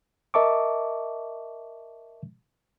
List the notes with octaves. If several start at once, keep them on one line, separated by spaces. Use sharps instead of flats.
A#4 D#5 E5 A5 C#6 D6